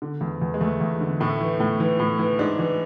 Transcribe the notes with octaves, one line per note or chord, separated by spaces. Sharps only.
D3
E2
E2
G#3
E2 A3
E2
D3
A2 A3
E3
A2
E3
A2
E3
G#2 D4
E3